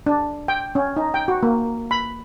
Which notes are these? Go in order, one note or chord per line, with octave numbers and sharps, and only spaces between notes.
D4
G5
C#4
D#4
G5
F#4
A#3
B5